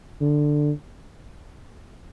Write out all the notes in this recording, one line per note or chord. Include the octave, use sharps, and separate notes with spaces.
D3